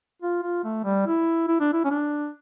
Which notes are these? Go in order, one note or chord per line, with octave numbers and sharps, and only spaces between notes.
F4
F4
A3
G3
E4
E4
D4
E4
C#4
D4